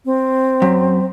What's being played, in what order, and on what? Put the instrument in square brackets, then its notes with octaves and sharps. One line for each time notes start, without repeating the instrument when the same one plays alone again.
[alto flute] C4
[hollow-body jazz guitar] F#2